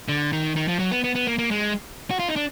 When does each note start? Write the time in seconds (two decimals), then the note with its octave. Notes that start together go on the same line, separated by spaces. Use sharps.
0.08 D3
0.32 D#3
0.56 D#3
0.68 F3
0.79 F#3
0.91 B3
1.04 B3
1.15 B3
1.27 A#3
1.39 A#3
1.51 G#3
2.11 F#4
2.19 F4
2.28 D#4
2.36 D4